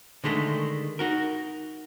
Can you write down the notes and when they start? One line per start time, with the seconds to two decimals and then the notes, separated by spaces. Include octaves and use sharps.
0.24 D3 D#3 G#3 A3
0.99 D#4 F#4 A#4